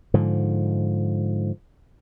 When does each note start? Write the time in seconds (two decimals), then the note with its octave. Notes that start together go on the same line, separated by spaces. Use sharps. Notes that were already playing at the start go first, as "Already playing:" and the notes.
0.14 G#2 D3 F3